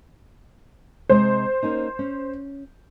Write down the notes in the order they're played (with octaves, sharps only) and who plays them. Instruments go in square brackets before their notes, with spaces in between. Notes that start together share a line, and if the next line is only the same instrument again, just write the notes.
[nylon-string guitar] C3 G#3 D#5 [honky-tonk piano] C5
[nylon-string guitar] A#3 C#4 D#4
C#4